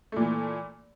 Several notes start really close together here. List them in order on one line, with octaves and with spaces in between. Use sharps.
A3 A#2 E3